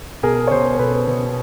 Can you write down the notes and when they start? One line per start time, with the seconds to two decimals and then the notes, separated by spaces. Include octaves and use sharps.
0.23 B2 G#4 A#4
0.47 C#5
0.51 B2 A#4 C5
0.74 C5
0.79 B2 A4 B4
1.07 B2